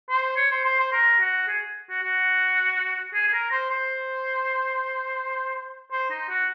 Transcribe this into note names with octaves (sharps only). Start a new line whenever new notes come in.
C5
C#5
C5
C5
C5
A#4
F#4
G#4
F#4
F#4
G#4
G#4
A#4
C5
C5
C5
D#4
F#4